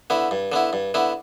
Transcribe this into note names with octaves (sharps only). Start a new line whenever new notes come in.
D3 B3 E4
G2
D3 B3 E4
G2
D3 B3 E4